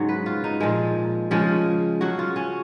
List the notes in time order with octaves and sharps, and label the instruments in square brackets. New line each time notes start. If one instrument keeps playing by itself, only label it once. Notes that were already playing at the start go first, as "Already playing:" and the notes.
Already playing: [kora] G#2 C#3 F#3 C#5
B4
F4
D#4
A#2 F3 G#3
C#3 F3 G#3
C#3 F#3 F#4
F4
C#4